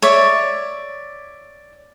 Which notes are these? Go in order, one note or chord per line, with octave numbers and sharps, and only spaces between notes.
C#5 D5 E5